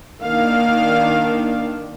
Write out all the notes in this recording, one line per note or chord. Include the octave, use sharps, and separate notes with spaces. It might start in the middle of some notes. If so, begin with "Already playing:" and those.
D#3 A#3 D4 F5